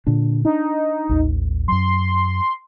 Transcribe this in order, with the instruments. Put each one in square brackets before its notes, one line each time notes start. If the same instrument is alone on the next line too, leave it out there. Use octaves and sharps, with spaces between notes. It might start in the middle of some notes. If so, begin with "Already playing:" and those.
[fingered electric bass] A#2 D3 D4
[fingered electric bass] D4 [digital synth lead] D#4
[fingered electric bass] A1 D#2
[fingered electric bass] F#2 F#3 [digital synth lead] C6